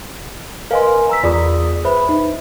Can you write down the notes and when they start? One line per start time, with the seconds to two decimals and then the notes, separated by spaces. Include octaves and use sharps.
0.71 A#4 B4 D#5 F5 G#5 C6
1.09 A#5 E6 B6
1.23 E2 F4 G#4 D5 D#6
1.85 B4 C5 E5 B5
2.09 D#4